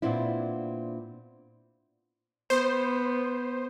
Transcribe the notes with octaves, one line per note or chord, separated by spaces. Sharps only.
A#2 B3 C4 D4 E4
B3 C5